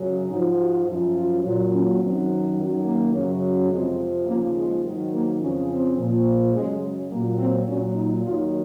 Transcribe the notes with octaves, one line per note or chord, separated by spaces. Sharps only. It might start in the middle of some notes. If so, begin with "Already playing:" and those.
Already playing: F#2 C#3 F#3
G#2 F3 D#4
F#4
F#2 F3
F4
A#2 F#3 F4
C#4
F#2 D#3 F#3 C4
F#2 D#3 F#3
A#3
F#2 C#3 F#3
F2 C3 F3 G#3
D#2 C#3 F3 A#3
G#3
G#2 D#3 F#3
A#3
F2 C#3 F3 C#4
C4
A#2 F3
F#2 C#3 F#3 G#3
A#2 F#3 A#3
C4
A#2 F#3 C#4
D#4
D#2 D#3 F#3 F4